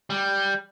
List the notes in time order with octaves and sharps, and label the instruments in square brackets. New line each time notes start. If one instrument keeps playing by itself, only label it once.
[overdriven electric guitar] G3